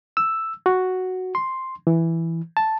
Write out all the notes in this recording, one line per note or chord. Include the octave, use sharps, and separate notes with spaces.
E6
F#4
C6
E3
A5